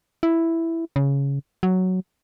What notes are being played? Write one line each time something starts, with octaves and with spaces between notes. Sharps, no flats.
E4
C#3
F#3